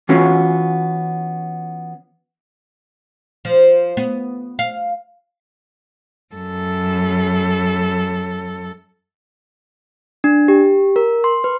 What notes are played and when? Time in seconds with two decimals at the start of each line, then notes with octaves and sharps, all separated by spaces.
0.09 E3 B3 C#4 F4 F#4
3.45 F3
3.97 B3
4.59 F5
6.35 F#2 A4
10.24 D4
10.48 G4
10.96 A#4
11.24 C6
11.44 B4